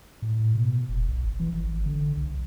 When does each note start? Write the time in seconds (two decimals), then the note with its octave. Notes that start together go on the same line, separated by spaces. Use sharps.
0.22 A2
0.55 B2
0.89 F1
1.08 B1
1.24 G#1
1.40 E3
1.54 G#1
1.86 D3
2.17 C2